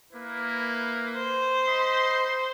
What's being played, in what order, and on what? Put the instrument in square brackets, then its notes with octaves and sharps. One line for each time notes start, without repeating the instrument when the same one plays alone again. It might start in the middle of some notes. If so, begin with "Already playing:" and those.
[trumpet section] A#3 E4 B4
[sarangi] C5
[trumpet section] D#5 B5 C6